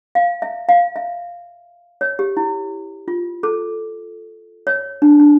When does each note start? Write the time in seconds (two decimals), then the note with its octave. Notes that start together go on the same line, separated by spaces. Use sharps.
0.15 F5
0.42 E5
0.69 F5
0.96 E5
2.01 C#5
2.19 G4
2.37 E4
3.08 F4
3.43 A4
4.67 C#5
5.02 D4
5.20 D4